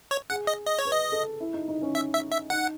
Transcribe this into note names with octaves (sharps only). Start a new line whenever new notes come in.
C#5
G#4 F#5
D#5
D#5
C#5
B4
D#5
A4
E4
D#4
D#4
C#4
E5
E5
E5
D#4 F#5